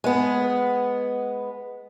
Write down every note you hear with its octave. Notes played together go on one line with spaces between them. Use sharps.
G#3 B3